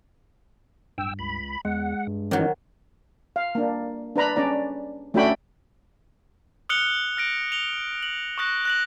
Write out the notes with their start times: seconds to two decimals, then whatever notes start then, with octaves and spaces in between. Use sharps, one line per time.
0.98 D1 G2 G5 E6
1.19 C#2 B5
1.65 E2 G#3 F#5
2.07 G2
2.31 D#3 E3 F#3 C#4 D#4
3.36 F5
3.55 A#3 D4
4.16 D4 B4 A#5 B5
4.36 C#4 D4 D5 A#5
5.14 A3 C#4 D4 F#4 G5 B5
6.69 D#6 F6 F#6 C#7 F7 G7
7.17 F6 A#6 D7
7.52 F7 G7
8.03 F#7
8.38 C#6 D#6 F#6 A#6
8.65 F#6 A#6 F#7